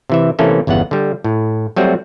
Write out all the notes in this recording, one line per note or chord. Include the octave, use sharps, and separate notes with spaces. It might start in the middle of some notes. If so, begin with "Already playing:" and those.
C3 E3 E5
C3 E3 A3 A#3 C#4 A4
G1 E2 C#3 B3 F#5
D3 G3
A2
F#3 G3 A3 C4 F#4